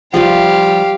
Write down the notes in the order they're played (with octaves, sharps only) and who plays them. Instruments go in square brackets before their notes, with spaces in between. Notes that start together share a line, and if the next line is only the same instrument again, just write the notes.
[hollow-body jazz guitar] F3 G3 F4 [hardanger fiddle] G4 F5